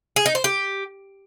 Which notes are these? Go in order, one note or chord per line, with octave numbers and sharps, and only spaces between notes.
G#4
D#4
C5
G4